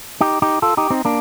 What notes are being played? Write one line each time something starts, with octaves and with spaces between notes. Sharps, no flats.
D#4 G4
D#4 G4
F4 A4
D#4 G4
C4 D#4
A#3 D4